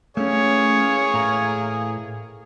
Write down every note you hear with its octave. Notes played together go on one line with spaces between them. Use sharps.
E3 A3 A#3 C#4 G#4 C#5
A2 A3 A#5